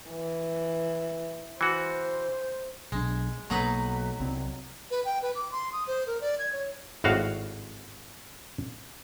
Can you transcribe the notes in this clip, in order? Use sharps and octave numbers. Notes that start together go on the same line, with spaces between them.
E3
E3 F#4 C5
B1 G#3 D4
B1 F#3 A#3 D#4 B4
C2 C4
B4
G5
B4
D6
C6
D#6
C5
A#4
D5
G#6
C#5
G#1 A2 F#4 F5